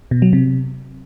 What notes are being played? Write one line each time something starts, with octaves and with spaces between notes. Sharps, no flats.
B2
F#3
C3